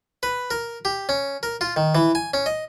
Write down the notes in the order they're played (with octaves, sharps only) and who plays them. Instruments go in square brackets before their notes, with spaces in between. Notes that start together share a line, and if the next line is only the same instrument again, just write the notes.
[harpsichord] B4
A#4
G4
C#4
A#4
F4
D#3
E3
G#5
C#4
D#5